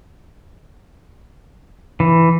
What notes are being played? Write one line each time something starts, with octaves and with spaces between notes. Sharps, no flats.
E3